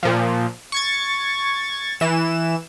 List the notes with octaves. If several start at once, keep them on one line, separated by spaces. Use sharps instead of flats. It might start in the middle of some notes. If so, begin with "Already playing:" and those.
A#2 F3
C#6 G#6 A6
E3 E7